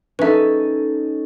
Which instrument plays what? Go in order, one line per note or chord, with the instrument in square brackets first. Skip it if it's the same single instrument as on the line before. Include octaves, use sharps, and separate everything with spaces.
[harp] C#4 D#4 A4 [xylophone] B4 E5